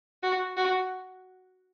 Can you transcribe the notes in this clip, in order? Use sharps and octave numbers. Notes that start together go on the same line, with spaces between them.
F#4
F#4